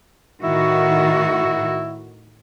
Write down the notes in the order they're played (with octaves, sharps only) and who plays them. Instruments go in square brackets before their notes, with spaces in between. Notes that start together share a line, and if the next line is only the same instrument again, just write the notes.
[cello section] A2 D#3 F#4 [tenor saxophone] E4